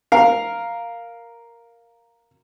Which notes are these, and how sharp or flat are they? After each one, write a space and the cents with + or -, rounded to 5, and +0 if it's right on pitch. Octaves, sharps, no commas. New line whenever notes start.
A#4 +0 F5 +0